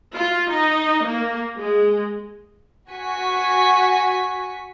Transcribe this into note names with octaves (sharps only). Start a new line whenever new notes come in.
F4
D#4
A#3
G#3
F#4 G#5 C#6 B6